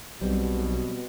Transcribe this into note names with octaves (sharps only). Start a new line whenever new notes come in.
B1 B2 G3 C4